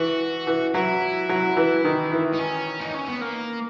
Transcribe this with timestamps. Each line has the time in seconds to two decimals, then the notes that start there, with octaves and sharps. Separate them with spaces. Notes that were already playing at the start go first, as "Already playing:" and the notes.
Already playing: E3 F#4
0.47 E3
0.74 F#3 E4
1.29 F#3
1.57 E3
1.84 D#3
2.12 E3
2.33 D#4
2.39 C#4
2.81 D#4
2.94 C#4
3.08 B3
3.21 A#3